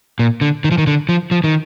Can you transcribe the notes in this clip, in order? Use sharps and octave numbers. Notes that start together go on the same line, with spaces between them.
A#2
D3
D#3
F3
D#3
D3
F3
F3
D#3